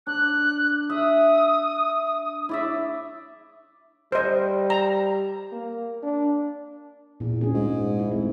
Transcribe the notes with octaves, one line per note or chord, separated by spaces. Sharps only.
D4 F#6
E5 D#6
E4 D5 E5
G3 C5 D#5
A#5
A#3
D4
E2 A#2
D2 C#4 G#4
G#2
E4
G#1 A3